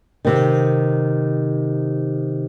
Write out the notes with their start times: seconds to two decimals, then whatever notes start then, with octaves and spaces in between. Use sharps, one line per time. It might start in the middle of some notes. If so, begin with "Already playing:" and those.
0.25 C3 D#3